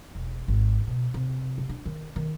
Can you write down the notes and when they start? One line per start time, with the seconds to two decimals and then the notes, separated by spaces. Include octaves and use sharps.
0.15 E1
0.48 G#1
0.87 B2
1.14 C3
1.58 C3
1.69 D4
1.85 D#3
2.16 D#3